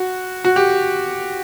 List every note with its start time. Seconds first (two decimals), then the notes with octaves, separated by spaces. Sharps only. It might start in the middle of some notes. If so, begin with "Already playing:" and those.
Already playing: F#4
0.45 F#4
0.56 G4